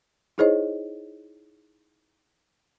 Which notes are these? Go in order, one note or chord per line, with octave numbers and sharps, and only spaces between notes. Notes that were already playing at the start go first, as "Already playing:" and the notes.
D#4 E4 G#4 C5 C#5 D#5